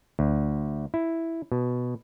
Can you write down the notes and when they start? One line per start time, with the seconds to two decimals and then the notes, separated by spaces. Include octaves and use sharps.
0.19 D2
0.94 E4
1.52 B2